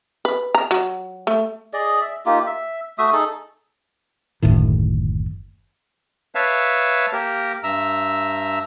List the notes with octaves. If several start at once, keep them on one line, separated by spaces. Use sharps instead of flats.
B4
A#5
F#3
A3
G#4 D5 D#5
E5
A#3 D#4 F4 G4
E5
A3 F#4 E5 D#6
D#4 G#4 A4
F#1 D2 A2 D#3
B4 C#5 E5 F5 A5
A#3 G4 A#4
G2 E5 A#5 E6